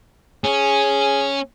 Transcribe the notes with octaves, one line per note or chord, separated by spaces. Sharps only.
C#4 G#4